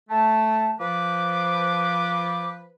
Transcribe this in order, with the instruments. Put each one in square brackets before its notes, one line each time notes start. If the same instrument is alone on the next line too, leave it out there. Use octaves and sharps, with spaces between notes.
[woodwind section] A3 [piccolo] A5
[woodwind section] F3 B4 [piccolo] D6